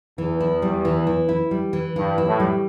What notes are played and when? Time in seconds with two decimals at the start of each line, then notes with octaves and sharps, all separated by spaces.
0.18 E2 E3
0.40 E4
0.62 G3
0.85 E3
1.07 E3
1.29 E4
1.51 G3
1.73 E3
1.96 G2 E3
2.18 E4
2.25 A2
2.40 G3